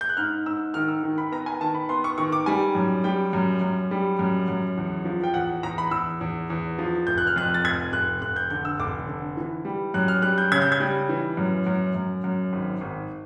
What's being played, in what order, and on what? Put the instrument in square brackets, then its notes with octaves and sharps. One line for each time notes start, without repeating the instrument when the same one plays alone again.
[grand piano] G6
F#6
G#2 F6
G#2 E6
D#3 F6
E6
D#3
B5
B3 A#5
G#5
D#3 A5
B5
B3 C6
C#6
D#3 C#6
D6
G3 G#5
F#2
G3 G5
F#2
F#2
G3
F#2
F#2
E2
F3
G5
E2 F#5
E2 A#5
B5
E2 E6
E2
E2
F3
F1 G6
F#6
F6
F2 F#6
A6
F1 G#6
F1 F#6
F1 F#6
G6
D3 G6
E6
F1 D6
D3
E3
G3
F#2 F#6
F6
G3 F#6
G6
C#3 G#6
G6
G#6
G3
E3
F#2
F#2
F#2
F#2
G#1
G#1